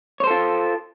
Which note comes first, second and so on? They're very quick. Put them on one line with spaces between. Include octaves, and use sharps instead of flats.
C#5 C5 A4 F4